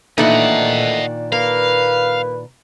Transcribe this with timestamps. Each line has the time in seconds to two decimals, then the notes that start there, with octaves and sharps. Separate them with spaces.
0.18 A#2 D#3 E3 A3 D4 D#4 D#5 F#5
1.32 A#3 B4 F5